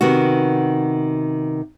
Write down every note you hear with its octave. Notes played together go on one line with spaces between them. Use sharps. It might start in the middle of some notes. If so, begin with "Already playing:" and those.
C3 D#3 B3 F#4